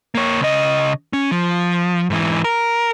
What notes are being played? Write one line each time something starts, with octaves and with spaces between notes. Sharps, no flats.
A#3 C#5
C#3 D#5
C#4
F3
G#2 E3
A#4